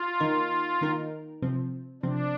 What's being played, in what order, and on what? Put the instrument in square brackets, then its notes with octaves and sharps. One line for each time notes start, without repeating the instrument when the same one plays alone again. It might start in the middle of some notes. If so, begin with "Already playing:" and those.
Already playing: [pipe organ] F4
[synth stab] D#3 A#3 D#4 A#4
D#3 A#3 D#4 A#4
C3 F3 C4
[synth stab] C3 F3 C4 [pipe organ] D4